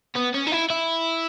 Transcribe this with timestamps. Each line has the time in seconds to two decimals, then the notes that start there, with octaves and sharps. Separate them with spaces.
0.16 B3
0.35 C#4
0.47 D#4
0.52 E4
0.70 E4